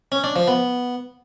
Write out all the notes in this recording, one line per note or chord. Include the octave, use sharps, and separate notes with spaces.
C#4
D4
F3
B3